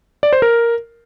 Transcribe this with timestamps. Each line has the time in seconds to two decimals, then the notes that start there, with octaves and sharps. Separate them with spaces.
0.23 D5
0.33 C5
0.42 A#4